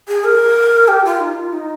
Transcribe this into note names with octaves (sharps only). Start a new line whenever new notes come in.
G#4
A#4
G4
F4
D#4
F4
D#4